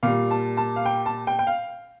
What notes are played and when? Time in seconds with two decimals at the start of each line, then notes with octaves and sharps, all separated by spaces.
0.03 A#2 G3 F5
0.31 A5
0.57 A5
0.76 F5
0.86 G5
1.06 A5
1.27 G5
1.39 G5
1.47 F5